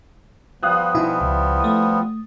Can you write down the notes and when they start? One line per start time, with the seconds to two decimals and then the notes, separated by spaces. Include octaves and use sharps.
0.63 F3 G3 B3 F5 D#6 F#6
0.95 B2 D#4 E4 G#5
1.21 C#2
1.60 A3 D#6